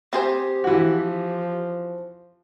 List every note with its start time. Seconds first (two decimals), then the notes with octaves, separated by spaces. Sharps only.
0.13 C4 G4 G#4 C5
0.64 E3 F3 F#4